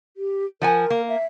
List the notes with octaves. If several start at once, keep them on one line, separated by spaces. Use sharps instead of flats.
G4
F3 A#4 F#5 G#5
A#3
E5